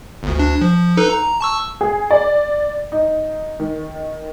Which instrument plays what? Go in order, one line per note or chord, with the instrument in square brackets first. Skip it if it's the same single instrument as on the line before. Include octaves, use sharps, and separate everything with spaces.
[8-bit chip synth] G1 D2
D2 D4
F3
D#4 A4 B4
A#5
A5 C#6 E6
[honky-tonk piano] G#4
D5
D#4
D#3